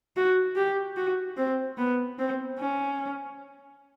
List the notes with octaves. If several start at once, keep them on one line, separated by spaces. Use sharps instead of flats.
F#4
G4
F#4
C4
B3
C4
C#4